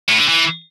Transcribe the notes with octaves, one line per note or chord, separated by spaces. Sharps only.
A2
D3
E3